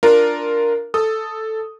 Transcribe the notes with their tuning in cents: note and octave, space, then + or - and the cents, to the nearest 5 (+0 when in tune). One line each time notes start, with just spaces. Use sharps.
D4 +0 F4 +0 A#4 +0
A4 +0 D#6 +0